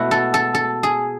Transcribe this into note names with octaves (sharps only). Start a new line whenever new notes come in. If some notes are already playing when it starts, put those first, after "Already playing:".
Already playing: B2 A3 E4 F#4
A4
A4
A4
G#4